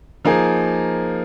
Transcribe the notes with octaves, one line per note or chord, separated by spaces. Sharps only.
F3 A#3 D#4 G#4